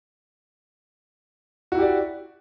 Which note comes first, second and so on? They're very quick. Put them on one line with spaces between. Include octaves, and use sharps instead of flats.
F#4 E4 G4 D5